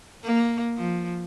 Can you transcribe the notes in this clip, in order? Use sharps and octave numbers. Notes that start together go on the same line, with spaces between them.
A#3
F3